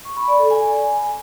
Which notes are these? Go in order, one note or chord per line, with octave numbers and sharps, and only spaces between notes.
C#6
B5
D5
A4
G#5